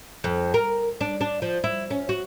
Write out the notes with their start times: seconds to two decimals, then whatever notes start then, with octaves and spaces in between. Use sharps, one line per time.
0.24 F2
0.54 A#4
1.01 D4
1.21 D4
1.42 F3
1.64 E4
1.90 C#4
2.09 F#4